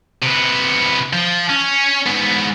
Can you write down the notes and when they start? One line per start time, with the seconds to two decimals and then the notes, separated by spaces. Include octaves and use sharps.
0.22 C3 B3
1.13 F3
1.49 C#4
2.06 G#2 B3